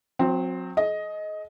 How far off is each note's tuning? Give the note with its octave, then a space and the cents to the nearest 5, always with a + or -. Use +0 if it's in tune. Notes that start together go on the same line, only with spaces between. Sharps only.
F#3 -30 C4 +0
G#4 +45 D#5 +10